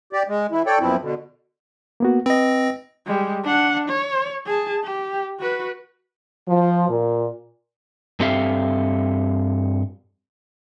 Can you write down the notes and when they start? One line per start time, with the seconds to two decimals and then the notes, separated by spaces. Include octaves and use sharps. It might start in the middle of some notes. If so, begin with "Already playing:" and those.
0.13 G4 D5
0.28 G#3
0.52 E3 E4
0.66 A4 C#5 D5 G5
0.80 F#2 B2 F3 C4 E4
1.02 B2 D3
2.00 A#3 B3 F#4
2.26 C4 B4 D#5 A#6
3.06 G3 G#3
3.44 D4 F#5
3.88 C#5
4.46 G#4 A5
4.84 G4
5.39 F#4 B4
6.48 F3
6.89 A#2
8.20 G2 C4 G4 A4 E5 F5